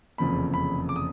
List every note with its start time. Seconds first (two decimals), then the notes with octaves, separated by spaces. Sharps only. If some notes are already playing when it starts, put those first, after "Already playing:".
0.18 F1 E2 C#3 F3 A#3 B5
0.54 B5
0.89 D6
0.96 D#6